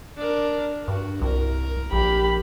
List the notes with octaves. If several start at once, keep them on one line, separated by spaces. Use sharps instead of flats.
D4 A#4
G2 F#4
C2 A#4
A#1 G4 B5